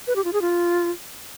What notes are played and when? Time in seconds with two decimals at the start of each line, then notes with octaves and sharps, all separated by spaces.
0.07 B4
0.16 G4
0.24 F4
0.33 G#4
0.41 F4